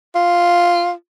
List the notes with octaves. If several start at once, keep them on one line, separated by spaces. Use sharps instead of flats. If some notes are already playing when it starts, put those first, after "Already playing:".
F4